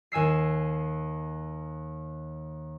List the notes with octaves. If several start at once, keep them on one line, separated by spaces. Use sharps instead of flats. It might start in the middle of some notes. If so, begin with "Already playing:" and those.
D#2 G#5 E6 C7